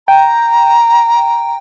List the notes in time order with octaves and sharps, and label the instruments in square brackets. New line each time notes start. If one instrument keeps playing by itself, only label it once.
[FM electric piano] G5 [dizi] A#5